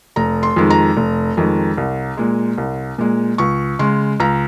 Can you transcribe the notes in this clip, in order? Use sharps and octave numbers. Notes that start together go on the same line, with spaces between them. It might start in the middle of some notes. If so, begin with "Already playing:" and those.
F1 A#5
C6
F2 D#3 G#3
A#5
F1
F2 D#3 G#3
C2
A#2 G#3
C2
A#2 G#3
C#2 C#6
C#3 G#3 C6
C#2 A#5